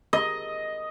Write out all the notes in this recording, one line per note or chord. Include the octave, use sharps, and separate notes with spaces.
D#5